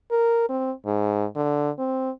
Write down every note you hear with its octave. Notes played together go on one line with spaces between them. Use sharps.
A#4
C4
G#2
D3
C4